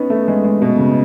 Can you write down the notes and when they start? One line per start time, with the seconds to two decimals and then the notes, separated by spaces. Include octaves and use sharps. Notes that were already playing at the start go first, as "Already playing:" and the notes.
Already playing: B3 C#4 D#4
0.10 A3
0.28 G#3
0.44 G#3
0.62 B2
0.78 C#3